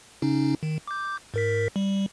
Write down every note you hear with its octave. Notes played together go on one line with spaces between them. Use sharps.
C#3 C#4 D#4
D#3
D6 G6
G#2 A#4 B6
G3